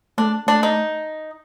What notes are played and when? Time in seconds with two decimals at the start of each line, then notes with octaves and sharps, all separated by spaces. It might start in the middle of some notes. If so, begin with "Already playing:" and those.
0.18 A3 D4
0.47 A3 D4
0.63 D#4